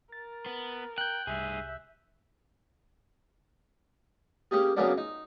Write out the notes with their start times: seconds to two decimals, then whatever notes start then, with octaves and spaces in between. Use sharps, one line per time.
0.12 A#4 A6
0.46 B3
0.98 G5 F#6 G6
1.27 C2 G2 G#4 E5
4.51 A#3 C#4 G4 G#4
4.77 C#3 F#3 A#3 B3 C#4 D4
4.98 D#4